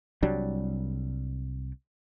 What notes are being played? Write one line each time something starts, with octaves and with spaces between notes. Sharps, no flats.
C2 F#3 G3 D4